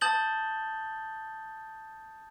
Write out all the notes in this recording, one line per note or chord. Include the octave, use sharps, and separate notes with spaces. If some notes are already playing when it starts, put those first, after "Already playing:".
A5 D#6 G6 A6 F#7 G7